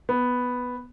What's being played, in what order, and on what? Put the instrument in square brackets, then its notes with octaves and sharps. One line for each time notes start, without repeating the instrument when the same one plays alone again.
[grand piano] B3